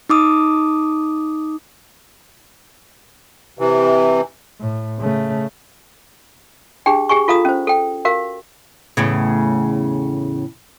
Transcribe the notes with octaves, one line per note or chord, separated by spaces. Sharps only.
D#4 D6 D#6
C3 E3
A2
C#3 A3
D4 G4 G#4 G5
G4 G#4 G#5 C#6
F4 A4 F5 A#5 D#6
C#4 C5
A4 G5
F#4 A#4 F5
E2 A2 C#3